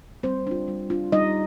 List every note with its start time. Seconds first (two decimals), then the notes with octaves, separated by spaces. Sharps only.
0.23 G3 C4 C5
0.47 D4 F4
0.68 G3
0.90 D4 F4
1.12 G3 D#4 D#5